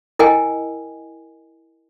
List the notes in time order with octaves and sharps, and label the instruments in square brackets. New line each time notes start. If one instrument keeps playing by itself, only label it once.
[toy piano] E4 A#4 D#5 G5 G#5